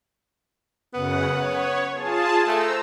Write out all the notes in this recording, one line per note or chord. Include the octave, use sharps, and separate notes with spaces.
F#2 C#3 B3 F#5
C#5
F4 G#4 A5
A3 C5 A#5 E6